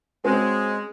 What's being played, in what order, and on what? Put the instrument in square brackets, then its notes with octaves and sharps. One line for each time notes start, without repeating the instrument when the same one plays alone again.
[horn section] G#3 [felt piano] C4 C#4 F#4